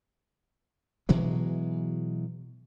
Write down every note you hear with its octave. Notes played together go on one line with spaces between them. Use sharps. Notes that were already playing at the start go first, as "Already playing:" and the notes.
B2 E3 F#3 G#3